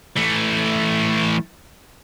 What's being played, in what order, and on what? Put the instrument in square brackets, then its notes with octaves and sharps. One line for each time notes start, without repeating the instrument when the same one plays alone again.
[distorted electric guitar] E3 A3